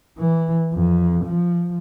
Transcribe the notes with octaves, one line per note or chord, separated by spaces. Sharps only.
E3
F2
F3